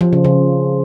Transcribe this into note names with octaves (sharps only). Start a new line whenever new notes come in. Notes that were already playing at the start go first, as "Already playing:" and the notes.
F3
C#3
C#3